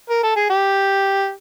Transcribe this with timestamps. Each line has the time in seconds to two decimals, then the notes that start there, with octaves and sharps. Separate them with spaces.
0.10 A#4
0.23 A4
0.36 G#4
0.50 G4